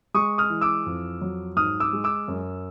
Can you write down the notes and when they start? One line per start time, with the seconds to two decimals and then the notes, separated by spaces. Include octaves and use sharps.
0.14 G#3 C#6 D#6
0.38 D#6 F6
0.50 E3
0.61 D6 E6
0.86 F2
1.21 F#3
1.56 G#2 D#6 F6
1.80 D6 E6
1.93 G#3
2.04 D6 E6
2.28 F#2